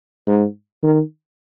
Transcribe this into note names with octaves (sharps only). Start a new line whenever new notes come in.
G#2
D#3